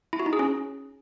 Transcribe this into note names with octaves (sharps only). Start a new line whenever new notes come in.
E4
F#4
D#4
G#4
C#4